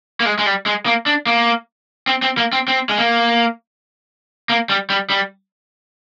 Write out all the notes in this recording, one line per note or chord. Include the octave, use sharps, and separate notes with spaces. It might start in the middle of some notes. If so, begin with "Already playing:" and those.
A#3
G#3
G#3
G3
G#3
A#3
D4
A#3
C4
C4
A#3
C4
C4
G#3
A#3
A#3
G3
G3
G3